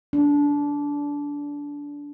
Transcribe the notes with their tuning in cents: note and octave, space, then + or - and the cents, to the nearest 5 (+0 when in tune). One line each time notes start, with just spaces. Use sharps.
D4 -20